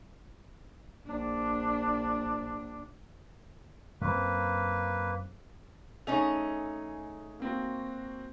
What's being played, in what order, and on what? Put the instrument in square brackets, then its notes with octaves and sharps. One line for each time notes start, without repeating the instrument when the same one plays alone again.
[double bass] A#1 D4
[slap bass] F#2 C4 [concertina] A#3 B4
[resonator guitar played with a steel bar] A3 C#4 D#4 [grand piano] G#4 F7
[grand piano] A#3 C4 F#4